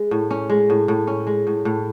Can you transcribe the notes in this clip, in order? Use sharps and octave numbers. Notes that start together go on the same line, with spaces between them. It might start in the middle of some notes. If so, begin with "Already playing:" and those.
Already playing: G#3
A2
C#4
G#3
A2
A2
C#4
G#3
A2
A2